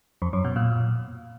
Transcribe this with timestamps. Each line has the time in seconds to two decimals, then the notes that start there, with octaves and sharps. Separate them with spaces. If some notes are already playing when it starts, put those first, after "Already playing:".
0.22 F2
0.33 F#2
0.45 B2
0.56 A#2